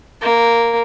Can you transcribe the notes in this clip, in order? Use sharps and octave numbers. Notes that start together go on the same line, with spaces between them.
A#3